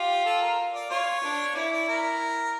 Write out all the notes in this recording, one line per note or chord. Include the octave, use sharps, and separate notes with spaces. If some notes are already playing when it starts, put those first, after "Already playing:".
Already playing: F4 G4
A4
A#4
D5
F4 C#5
D4
E4 D5
D5
A#4